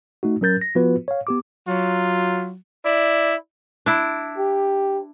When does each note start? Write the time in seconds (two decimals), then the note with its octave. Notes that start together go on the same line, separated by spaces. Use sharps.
0.23 A3 D#4 F#4
0.41 F#3 C#4 A#4 G6 A6
0.61 A#6
0.75 F3 B3 F4 F#4 B4
1.08 C#5 F5
1.27 B3 G4 D6
1.67 F#3 F4
2.85 E4 D5
3.86 D4 E4
4.38 G4